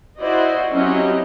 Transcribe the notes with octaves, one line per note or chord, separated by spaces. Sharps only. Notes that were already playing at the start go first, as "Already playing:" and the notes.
E4 F#4 C5 D5 D#5
F#3 C4 C#4 E4 G4 D#5